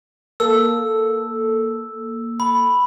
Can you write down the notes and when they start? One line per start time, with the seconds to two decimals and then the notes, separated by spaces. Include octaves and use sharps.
0.40 A#3 A4 E6
2.40 B5